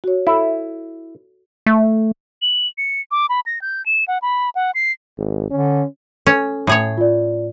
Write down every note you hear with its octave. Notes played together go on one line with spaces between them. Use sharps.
F#4 C#5
E4 A4
A3
F#7
C#7
D6
B5
A#6
G6
E7
F#5
B5
F#5
C7
G#1
D3 C#4
C#4 A4
A2 G#4 C#5
F4 D5